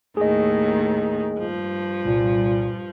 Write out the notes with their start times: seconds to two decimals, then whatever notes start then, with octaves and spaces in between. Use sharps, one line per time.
0.17 D#2 A2 D#3 G#4 D#5
1.34 G2 F3
2.05 C2 A#2